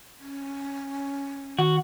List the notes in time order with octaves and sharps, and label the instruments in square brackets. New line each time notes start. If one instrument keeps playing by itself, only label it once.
[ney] C#4
[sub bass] D#3 [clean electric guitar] F#4